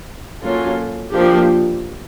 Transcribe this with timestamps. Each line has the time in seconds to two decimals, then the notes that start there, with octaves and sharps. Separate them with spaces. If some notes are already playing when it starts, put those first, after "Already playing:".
0.42 F#3 A#3 C#4 F4 A4
1.12 F3 A#3 D4 G4